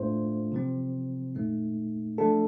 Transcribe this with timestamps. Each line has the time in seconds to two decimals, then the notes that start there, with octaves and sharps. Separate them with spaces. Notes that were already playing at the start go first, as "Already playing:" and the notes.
Already playing: A2 A3 D4 F4 C5
0.52 C3 F3 C4
1.35 A#2 A3 D#4
2.18 F3 A3 D4 A4